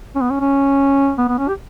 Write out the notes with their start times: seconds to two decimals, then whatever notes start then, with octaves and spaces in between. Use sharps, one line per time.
0.15 C#4
0.21 B3
0.30 C#4
0.40 C#4
1.18 B3
1.28 B3
1.38 C#4
1.48 G4